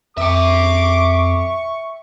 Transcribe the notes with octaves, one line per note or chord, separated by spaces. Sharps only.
F2 E5 G5 C#6 D6